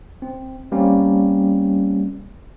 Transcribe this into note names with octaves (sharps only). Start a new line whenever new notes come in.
C4
G3 A#3 C4 C#4